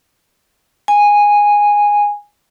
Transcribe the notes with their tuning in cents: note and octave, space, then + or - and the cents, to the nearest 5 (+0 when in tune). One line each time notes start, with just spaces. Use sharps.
G#5 -10